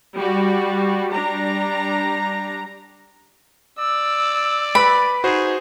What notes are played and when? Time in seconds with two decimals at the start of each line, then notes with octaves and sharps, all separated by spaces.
0.14 G3 F#4
1.12 G3 D4 A#5
3.78 D5 E6
4.75 B4 B5 D7
5.24 D#4 F#4 G#4 C5